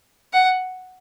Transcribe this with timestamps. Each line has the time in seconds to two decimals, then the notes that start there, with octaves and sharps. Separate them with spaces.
0.33 F#5